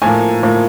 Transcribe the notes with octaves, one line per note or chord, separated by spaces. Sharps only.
A2 F3 A#3 G#5
A2 F3 A#3